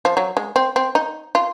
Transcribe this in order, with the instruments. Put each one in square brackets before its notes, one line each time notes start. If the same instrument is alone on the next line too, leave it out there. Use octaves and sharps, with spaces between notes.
[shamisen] F3
F#3
G#3
C4
C4
D#4
F4